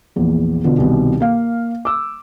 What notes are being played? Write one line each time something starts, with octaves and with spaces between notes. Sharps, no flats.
A#1 E2
B2 D3 F4
C2 B2 D#3
A#3 F5
D6 E6